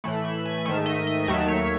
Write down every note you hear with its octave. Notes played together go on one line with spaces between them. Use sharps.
A2 E3 A3 B5
E5
G#5
G#2 D#3 A3 E5
D#5
D#5
D#2 D#3 F#3 A3 E5
C#5